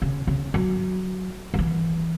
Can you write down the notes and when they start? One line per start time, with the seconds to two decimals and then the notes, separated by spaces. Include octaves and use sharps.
0.02 C#3
0.27 C#3
0.54 F#3
1.54 F#3
1.59 E3